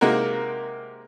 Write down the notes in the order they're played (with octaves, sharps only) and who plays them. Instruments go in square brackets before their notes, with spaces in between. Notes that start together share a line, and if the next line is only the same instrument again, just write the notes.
[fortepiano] C3 G#3 A#3 D#4 F#4 A#4